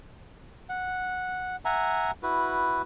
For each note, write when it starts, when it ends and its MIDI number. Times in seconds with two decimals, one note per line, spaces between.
0.69 1.56 78
1.65 2.11 76
1.65 2.11 78
1.65 2.11 80
1.65 2.11 82
2.23 2.82 64
2.23 2.82 66
2.23 2.82 71